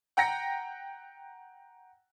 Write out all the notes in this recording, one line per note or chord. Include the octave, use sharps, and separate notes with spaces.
F#5 G5 A#5 A#6 C#7